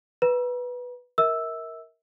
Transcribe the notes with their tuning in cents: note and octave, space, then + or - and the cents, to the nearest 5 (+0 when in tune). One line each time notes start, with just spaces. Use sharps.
B4 +0 A#5 +45
A#4 +5 E5 -40 E6 +0